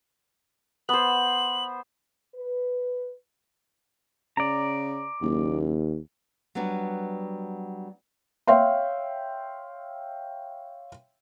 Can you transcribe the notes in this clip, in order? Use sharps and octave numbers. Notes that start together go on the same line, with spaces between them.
B3 C5 F#7
B4
C#3 D5 A#5
F#1 D#2
F#3 G3 B3 D4
C#5 E5 F5 G5 C6